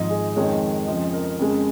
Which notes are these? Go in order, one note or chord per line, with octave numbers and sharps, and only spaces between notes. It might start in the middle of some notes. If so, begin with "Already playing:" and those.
Already playing: G#1 G#2 F3 D#5
G#4
F2 D#3 G#3 C#5
F2 C#3 F3 D#5
A#4
F2 C#3 G#3